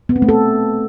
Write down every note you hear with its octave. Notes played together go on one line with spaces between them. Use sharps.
B3
C4
A3
A4